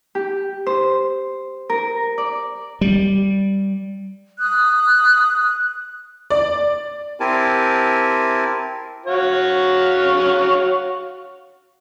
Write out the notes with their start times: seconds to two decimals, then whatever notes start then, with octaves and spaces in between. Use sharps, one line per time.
0.15 G4
0.66 C5
1.70 A#4
2.18 D5
2.81 G3
4.39 D#6 F#6
6.30 D5
7.20 C4 E4 G4 A#4 G#5 A5
9.06 F#4 C#5 F5